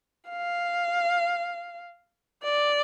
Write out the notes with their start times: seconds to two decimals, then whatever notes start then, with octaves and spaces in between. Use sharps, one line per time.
0.30 F5
2.44 D5